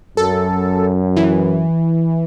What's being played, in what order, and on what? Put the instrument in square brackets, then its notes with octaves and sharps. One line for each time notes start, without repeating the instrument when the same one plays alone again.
[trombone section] F#2 [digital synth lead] A4
[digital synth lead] E3